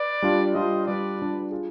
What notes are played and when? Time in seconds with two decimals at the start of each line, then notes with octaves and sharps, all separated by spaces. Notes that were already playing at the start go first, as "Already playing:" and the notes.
Already playing: B4 D5
0.22 G3 D4 F4
0.55 G3 D4 F4 C5 D#5
0.87 G3 D4 F4 B4 D5
1.19 G3 D4 F4
1.52 F4 G#4